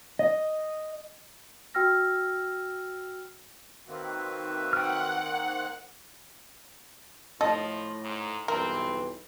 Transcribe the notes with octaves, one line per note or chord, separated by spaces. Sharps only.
D#5
F#4 G5 E6 F6 A#6
D#3 A#3 C4 F#4 B4 E5
F#5 G5 F6
A2 F3 A4 D#5
G#2
B1 G2 E3 C4 A#4